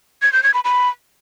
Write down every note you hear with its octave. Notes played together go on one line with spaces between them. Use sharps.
G#6
G6
G#6
B5
B5